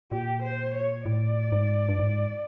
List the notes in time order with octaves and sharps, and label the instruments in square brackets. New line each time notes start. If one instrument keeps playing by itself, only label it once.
[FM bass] A#2 [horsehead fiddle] G4
[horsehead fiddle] C5
C#5
[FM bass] A2 [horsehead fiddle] D5
[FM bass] G#2
G2
G#2